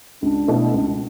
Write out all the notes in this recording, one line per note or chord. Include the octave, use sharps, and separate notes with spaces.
C#2 D4
B2 A3 E4
C#2